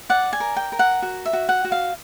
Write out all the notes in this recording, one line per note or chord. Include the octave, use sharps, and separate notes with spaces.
D5 F#5
G#5
A#4
G5
A#4
F#5
F#4
E5
F#4
F#5
F#4
F5